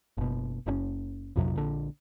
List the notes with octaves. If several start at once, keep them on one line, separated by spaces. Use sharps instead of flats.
F#1 B2
F#1 C3 C#4
A#1 F2 C3 F#3
A#1 D3